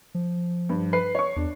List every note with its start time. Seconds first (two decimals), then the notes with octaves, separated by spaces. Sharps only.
0.15 F3
0.69 G2
0.93 B4 B5 C7
1.15 C#5 C#6
1.36 E2 D4